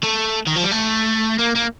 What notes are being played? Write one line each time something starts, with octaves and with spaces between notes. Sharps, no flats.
A3
D#3
F3
G3
A3
A#3
A#3